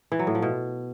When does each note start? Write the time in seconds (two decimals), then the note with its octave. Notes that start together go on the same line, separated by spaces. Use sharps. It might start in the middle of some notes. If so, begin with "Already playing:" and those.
0.12 E3
0.19 F#3
0.27 A2
0.35 F3
0.42 B2